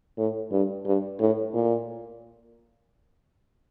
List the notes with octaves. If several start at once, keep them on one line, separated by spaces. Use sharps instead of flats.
A2
G2
G2
A2
A#2